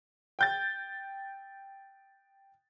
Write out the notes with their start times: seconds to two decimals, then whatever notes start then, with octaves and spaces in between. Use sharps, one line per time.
0.39 G5 G6 A6